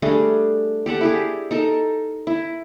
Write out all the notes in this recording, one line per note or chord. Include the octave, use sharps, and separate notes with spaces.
G3 A3 D4 G#4
G4 A4 D5 F#5
E4 G4 G#4
D#4 A4 A#4
E4